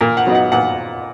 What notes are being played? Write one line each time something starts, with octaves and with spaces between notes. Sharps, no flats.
A#2 A#4
F#5
F#3 B3 D#4
F#5
A#2 F#5